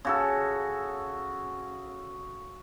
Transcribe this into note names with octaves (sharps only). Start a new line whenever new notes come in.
C#3 F#4 A4